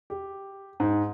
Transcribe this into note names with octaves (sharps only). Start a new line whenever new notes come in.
G4
G#2